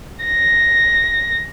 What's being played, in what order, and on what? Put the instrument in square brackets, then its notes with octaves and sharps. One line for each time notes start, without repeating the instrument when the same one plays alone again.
[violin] A#6